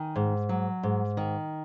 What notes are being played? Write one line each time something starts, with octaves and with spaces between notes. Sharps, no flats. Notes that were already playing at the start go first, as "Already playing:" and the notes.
Already playing: D#3 G#5
G#2
F#3
G#2
D#3